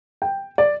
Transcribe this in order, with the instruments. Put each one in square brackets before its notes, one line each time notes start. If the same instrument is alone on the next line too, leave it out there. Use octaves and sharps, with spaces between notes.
[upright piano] G5
D5